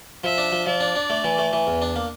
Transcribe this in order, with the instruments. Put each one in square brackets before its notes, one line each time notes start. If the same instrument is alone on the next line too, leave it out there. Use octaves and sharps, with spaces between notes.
[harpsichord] F3 [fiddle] E5
[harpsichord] D4
F3
[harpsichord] F3 [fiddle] D5
[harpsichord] D4
D4
A3
E3
A3
E3
E2
D4
A#3